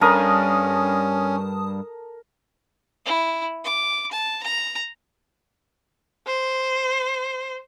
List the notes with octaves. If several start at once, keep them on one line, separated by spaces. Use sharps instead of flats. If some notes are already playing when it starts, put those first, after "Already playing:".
G2 C#4 A4 A#4 A5 D#6
E4
D6
A5
A#5
C5